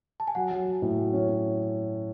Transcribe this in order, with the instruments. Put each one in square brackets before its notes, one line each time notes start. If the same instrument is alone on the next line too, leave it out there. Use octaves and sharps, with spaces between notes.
[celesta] A5
G#5
[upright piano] F#3 [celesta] F#5
[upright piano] F#3
F#3
A2
F#3
C#4
C#4